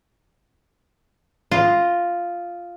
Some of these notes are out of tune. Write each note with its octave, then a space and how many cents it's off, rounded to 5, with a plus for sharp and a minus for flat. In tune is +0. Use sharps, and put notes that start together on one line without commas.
F4 +0 D#5 +0